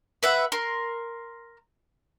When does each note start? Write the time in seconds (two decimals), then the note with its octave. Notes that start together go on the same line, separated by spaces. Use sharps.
0.23 B4 E5 F#5
0.52 A#4 C6